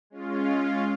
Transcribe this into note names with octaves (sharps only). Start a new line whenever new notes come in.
G#3 C#4 F4